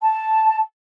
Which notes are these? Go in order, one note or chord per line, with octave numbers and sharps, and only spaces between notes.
A5